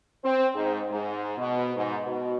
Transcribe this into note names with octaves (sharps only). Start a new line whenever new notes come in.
C4
G#2
G#2
B2
G#2
B2